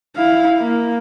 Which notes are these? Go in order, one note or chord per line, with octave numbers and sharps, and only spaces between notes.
E4 F5
A#3